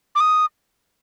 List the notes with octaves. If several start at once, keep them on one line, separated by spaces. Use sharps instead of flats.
D6
D#6